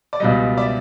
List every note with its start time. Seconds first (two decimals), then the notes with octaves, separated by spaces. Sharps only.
0.13 D5
0.20 C#2 B2 G3 D#5
0.57 D5 E5